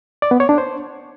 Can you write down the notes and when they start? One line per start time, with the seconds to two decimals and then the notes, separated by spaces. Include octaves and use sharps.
0.22 D5
0.31 B3
0.40 C#5
0.49 D4
0.58 C5